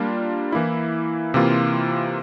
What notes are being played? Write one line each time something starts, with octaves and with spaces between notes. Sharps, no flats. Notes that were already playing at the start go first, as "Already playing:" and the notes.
Already playing: G3 A#3 D4 F4
E3 A#3 E4
C3 E3 A#3 F4